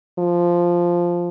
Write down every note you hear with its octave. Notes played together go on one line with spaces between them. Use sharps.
F3